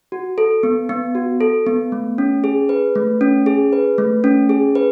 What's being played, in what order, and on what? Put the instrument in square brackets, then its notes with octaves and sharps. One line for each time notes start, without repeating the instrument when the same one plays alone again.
[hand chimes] F#4
A4
B3
B3
F#4
A4
B3
A3
C#4
G#4
B4
A3
C#4
G#4
B4
A3
C#4
G#4
B4